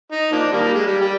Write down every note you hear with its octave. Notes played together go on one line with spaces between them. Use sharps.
D#4
F3 A#3 D4
D#3 G3 A#3
G3
G#3
G3
G3